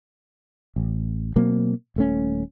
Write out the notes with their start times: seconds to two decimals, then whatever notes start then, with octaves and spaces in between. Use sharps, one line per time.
0.76 A1
1.36 B2 F#3 A#3 C4
1.96 D#1 A3 C#4